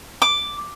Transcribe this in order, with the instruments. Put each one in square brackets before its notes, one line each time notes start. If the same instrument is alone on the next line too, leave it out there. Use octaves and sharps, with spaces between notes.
[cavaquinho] D6